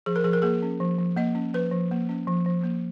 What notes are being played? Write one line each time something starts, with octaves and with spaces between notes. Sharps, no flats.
F3 G#4
A#4
F3 G#4
A#4
A#3 G#4
C#4
F3
F3
A#3 D#5
C#4
F3 B4
F3
A#3
C#4
F3
F3
A#3